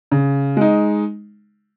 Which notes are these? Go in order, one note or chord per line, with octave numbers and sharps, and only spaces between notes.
C#3
G#3 D#4